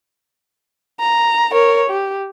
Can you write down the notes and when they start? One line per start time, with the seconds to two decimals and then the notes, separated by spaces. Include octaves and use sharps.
1.00 A#5
1.52 A#4 C#5
1.90 G4